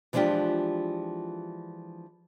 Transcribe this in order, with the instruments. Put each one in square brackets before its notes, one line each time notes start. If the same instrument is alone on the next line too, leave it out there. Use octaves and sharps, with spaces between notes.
[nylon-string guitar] E3 F3 G#3 D4 F4 G4